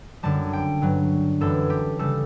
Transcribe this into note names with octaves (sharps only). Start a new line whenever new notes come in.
F#2 D3 G3 A5
G5
G2 F#3
F#2 E3 G3 A4
G4
C#3 G3 A4